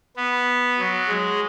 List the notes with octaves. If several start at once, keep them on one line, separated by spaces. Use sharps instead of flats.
B3
F#3
G#3